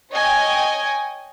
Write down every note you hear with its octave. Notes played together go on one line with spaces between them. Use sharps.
C#5 D#5 G5 G#5